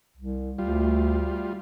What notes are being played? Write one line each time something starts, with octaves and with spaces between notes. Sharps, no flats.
C2
D2 G3 F4